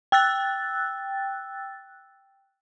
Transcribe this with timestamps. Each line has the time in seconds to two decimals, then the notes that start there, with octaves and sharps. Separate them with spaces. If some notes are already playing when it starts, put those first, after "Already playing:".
0.12 G5 E6 F#6 A6